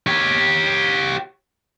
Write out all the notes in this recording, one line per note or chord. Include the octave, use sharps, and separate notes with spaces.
G4 C#5